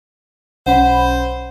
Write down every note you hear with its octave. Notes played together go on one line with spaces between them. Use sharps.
B1 C#4 C5 F#5 B5